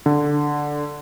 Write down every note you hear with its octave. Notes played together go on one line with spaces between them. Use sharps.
D3